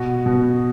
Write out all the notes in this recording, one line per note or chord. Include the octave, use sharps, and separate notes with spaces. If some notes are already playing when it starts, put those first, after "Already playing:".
Already playing: B2 F#4
B2